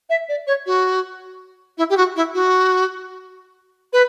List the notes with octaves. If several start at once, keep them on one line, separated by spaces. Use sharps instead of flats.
E5
D5
C#5
F#4
E4
G4
F#4
E4
F#4
B4